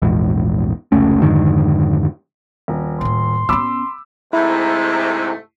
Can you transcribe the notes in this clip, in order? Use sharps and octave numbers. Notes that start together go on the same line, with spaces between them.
A#1 E2 G#2
F1 C#2 A3 C#4
F2 G#2 D3 D#3
D#1
A2 D#3 C6
B3 C#4 B5 D6 E6
G#2 C3 A3 E4